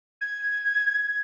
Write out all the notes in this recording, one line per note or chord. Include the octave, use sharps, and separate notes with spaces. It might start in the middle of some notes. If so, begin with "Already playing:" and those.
G#6